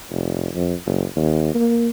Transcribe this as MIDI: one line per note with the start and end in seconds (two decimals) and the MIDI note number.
0.11 0.48 29
0.54 0.74 41
0.86 1.04 30
1.16 1.51 39
1.54 1.89 58